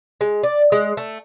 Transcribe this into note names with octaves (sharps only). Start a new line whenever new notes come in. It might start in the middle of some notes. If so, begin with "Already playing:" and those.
G#3
D5
G#3
A3